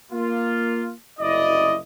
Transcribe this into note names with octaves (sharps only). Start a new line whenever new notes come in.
A#3 F4
F#1 C2 F#2 E4 D5 D#5